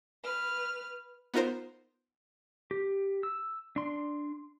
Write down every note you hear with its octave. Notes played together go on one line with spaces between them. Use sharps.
B4 F6
B3 D#4 F4 A#4 C5
G4
E6
D4 C6